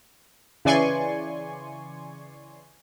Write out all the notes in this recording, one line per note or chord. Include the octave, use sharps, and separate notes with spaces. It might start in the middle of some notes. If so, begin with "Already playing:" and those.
C#3 E3 D5 G#5 C6 C#6